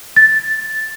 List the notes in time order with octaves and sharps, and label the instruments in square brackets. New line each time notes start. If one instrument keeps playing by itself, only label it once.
[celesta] A6